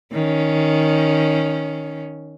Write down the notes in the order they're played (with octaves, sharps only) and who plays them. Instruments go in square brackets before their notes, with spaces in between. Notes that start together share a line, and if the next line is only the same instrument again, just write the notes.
[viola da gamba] D#3 C#4